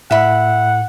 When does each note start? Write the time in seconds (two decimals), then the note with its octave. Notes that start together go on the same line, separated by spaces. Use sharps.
0.11 A2 E5 F#5 B5